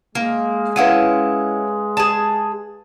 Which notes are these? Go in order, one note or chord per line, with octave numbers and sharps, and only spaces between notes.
G#3 A#3
C#4 E4 B4 F5 F#5 D#7
G#4 A5